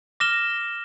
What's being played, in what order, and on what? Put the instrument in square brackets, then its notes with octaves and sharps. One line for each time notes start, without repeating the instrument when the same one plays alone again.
[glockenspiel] D6 F6 A#6 E7 G7